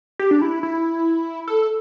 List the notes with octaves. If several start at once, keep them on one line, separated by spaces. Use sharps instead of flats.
G4
D4
E4
E4
A4